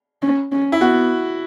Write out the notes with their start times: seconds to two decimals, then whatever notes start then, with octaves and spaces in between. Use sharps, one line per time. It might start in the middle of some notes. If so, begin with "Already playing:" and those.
0.23 C#4
0.52 C#4
0.72 E4
0.81 B3 F#4